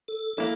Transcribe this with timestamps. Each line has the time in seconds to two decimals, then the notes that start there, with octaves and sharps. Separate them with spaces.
0.08 A4
0.37 A#3 E4 A4